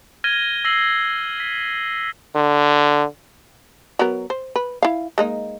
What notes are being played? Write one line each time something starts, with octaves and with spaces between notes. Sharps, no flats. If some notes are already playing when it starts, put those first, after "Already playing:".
F6 G#6 A#6 D#7 G7
E6 A#6 C7 F#7
B6
D3
F#3 B3 A#4
C5
B4
E4 F5
G#3 A#3 D#4